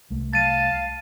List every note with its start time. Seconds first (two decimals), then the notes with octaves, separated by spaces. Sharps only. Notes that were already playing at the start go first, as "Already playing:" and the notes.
0.10 C2 A3
0.33 F5 A5 A6 D#7